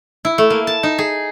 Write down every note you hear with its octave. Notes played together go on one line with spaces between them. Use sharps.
E4
A3
A#3
A5
D#4
G#4